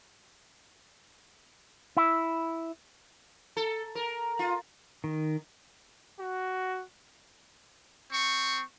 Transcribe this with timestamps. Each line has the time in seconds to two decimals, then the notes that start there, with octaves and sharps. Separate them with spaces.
1.97 E4
3.57 A4
3.95 A#4
4.39 F4
5.04 D#3
6.18 F#4
8.13 C4 C#6